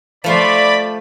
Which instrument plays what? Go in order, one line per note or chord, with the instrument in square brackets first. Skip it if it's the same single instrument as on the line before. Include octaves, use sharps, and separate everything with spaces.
[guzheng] F3 A3 C6 [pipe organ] D5 B5